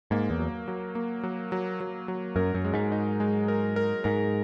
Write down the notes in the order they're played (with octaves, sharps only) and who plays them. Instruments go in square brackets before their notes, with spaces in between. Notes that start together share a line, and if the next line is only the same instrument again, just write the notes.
[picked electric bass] G#2 [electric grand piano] A#3
[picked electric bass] E2
[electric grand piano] F#3
F#3
A#3
F#3
F#3
F#3
F#3
[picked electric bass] F#2 [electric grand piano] A#4
[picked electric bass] F#2
[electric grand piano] G#3
[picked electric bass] G#2
[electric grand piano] D#4
G#3
A#4
A#4
[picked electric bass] G#2 [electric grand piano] A#4